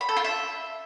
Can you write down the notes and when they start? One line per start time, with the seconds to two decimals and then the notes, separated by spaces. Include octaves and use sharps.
0.01 B5
0.09 A4
0.17 F4
0.24 E5